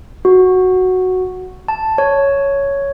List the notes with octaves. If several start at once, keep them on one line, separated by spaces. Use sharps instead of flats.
F#4
A5
C#5